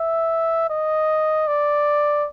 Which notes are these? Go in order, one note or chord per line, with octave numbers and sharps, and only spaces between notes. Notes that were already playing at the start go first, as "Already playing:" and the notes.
Already playing: E5
D#5
D5